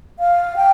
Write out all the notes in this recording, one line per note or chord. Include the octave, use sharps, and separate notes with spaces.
F5
G5